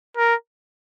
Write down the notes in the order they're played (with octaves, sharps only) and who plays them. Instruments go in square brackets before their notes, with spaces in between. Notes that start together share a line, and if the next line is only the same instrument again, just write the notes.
[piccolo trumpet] A#4